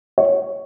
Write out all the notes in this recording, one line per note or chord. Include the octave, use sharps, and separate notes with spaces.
C#5